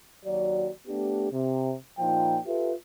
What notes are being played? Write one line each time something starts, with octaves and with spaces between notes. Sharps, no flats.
D#2 F#3 F#4 D5
A3 B3 D4 G4
C3
A#2 F3 D#4 G5
F4 G4 A4 B4 E5